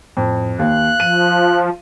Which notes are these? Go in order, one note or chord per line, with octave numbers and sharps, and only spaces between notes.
F2 A2
D#2 F5 F#6
F3 D#7